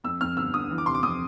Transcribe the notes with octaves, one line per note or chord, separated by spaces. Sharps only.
F2 E6
F2 F6
G1 E6
D3 D#6
E3
D6
C3 C6
D6
F2 D#6